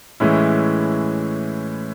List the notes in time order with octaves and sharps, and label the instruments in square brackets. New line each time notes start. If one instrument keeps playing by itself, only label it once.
[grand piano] A2 E3 G#3 C#4 E4